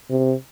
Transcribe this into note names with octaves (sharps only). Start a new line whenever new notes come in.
C3